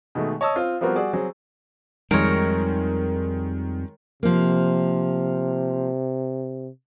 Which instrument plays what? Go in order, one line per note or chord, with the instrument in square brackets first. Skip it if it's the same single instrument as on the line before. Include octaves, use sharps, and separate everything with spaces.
[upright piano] B2 D#3 G#3 A3
C#5 D#5 A5 D#6 E6
C4 F4
F3 G3 B3 C4 F#4 A#4
G3 F#4 G#4 D5
F#3 C4 G#4
[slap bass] F2 G3 [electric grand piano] D#3 G#3 [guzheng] A#4 C#5
[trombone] C3 [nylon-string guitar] F3 A#3